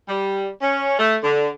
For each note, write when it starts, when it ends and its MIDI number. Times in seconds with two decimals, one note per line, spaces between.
0.08 0.48 55
0.61 0.95 61
0.99 1.16 57
1.23 1.48 50